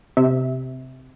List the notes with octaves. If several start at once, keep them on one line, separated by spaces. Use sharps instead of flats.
C3 E5